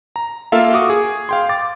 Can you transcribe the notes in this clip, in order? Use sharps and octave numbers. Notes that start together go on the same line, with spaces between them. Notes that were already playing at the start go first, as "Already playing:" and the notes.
A#5
A#3 F4 A4 E5 F5
F#4 D6 D#6
G#4
F5 G5 C6
D6 A6